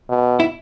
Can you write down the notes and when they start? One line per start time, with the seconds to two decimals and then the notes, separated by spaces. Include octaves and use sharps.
0.09 B2
0.40 E4